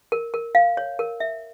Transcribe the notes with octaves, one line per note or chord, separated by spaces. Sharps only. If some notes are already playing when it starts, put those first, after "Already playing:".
A#4
A#4
F5
C#5
A#4
E5